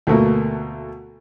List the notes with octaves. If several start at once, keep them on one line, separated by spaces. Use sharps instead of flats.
D2 B2 A3 A#3